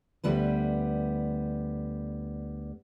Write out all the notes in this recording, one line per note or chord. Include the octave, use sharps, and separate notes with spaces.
D2 G3 B3 B4